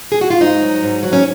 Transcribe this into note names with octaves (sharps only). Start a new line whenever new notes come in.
G#4
F#4
F4
G#2 D#4
F#3
G#2
F#3
C#4